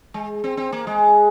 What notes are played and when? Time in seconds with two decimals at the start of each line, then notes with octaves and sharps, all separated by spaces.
0.14 G#3
0.44 C4
0.57 C4
0.72 A#3
0.87 G#3